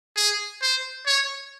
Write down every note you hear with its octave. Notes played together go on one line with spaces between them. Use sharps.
G#4
C5
C#5